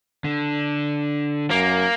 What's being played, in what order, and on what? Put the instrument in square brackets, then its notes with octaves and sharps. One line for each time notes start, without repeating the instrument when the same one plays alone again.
[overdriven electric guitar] D3
[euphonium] F#2 [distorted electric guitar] A#3